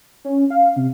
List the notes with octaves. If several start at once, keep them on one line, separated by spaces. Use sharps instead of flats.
C#4
F5
C3